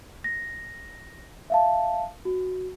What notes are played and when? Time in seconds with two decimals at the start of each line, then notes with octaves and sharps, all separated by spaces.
0.24 A#6
1.50 E5 F5 A5
2.25 F#4